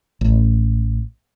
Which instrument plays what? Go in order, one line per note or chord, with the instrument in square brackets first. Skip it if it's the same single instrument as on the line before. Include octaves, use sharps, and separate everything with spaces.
[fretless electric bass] A1